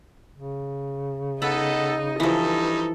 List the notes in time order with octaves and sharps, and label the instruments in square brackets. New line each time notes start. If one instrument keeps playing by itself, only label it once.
[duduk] C#3
[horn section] B3 A4 [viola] D#4 D#5 [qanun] B5
[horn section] G2 D#4 [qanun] E3 F3 [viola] A4